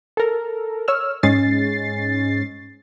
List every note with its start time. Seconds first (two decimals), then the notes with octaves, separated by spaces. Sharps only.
0.17 A4 A#4
0.88 C#5 E6 F6
1.23 G#2 G#3 C#4 A6 C7